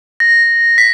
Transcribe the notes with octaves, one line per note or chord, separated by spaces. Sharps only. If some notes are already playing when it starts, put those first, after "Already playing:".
A#6
B6